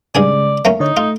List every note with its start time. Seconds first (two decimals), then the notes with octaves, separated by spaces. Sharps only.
0.15 G2 C#3 G#3 G#4 D5 G#5
0.65 A3 A#3 C#4
0.80 D3 D#4 C#5
0.97 A3 F4